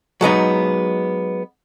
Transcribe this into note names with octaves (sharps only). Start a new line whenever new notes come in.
F#3 G#3 B3 D#4